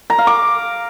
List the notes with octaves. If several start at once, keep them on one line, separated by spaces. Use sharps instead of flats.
A#5
F5
D6